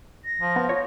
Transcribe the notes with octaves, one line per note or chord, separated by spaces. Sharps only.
A#6
F3
B3
F4 C#5